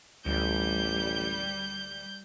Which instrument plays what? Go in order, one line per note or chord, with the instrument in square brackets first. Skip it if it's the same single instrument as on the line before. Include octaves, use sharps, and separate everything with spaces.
[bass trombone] A1 [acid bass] D2 [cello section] G3 [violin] G6